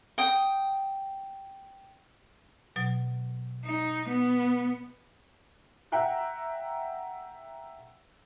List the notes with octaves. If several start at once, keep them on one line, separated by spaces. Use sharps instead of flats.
G5 D#6
B2 F#3
D#4
B3
E5 F#5 G5 A#5 F#6